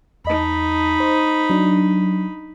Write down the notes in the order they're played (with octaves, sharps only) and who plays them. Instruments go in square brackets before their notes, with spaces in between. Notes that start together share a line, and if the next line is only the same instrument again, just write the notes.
[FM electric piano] E2 D#5 A5 [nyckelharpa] D#4 B5
[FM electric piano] C5
F#3 D4